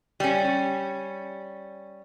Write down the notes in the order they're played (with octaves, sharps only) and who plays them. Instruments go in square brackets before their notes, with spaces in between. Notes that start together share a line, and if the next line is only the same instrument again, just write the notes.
[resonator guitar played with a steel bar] G3 C#4